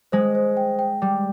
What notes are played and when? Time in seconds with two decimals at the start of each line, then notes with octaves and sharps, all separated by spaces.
0.12 G#3 C5
0.35 C5
0.57 G5
0.79 G5
1.02 G3 G5